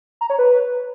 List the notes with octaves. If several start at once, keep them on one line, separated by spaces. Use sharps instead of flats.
A#5
C#5
B4